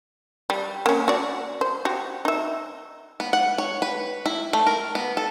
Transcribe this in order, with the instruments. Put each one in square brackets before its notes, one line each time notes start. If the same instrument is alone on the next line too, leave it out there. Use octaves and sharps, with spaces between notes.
[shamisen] G3
A#3 C#4
F#4 D5
C5
F#4 G4
D#4 E5
[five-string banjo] B3
F#5
C#5
B4
E4
A3
A#4
B3
A4